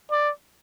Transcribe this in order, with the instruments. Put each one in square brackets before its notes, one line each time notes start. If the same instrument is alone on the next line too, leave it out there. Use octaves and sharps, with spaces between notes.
[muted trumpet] D5